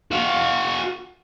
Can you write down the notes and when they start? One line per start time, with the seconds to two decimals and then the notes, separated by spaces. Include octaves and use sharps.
0.11 F#4 F5